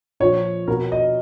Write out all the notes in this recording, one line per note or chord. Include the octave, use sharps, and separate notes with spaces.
A#2 F3 C#5
B2 A#4
D#5